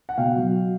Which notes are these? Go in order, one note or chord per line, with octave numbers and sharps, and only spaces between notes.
F#5
B2 F5 G5
F#3